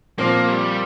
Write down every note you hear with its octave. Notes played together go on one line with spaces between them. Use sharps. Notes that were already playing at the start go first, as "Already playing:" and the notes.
A#2 F3 A#3 C4
G3